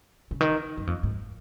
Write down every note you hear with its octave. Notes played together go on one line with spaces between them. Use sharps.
C#3
D#3
F#2
F2
G#2